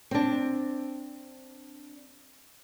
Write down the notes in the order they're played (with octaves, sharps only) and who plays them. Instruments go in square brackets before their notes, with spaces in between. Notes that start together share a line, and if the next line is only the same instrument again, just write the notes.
[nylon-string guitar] C4 D4